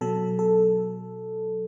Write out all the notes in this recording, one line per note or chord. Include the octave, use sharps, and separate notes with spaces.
B2 F#3 A4
A4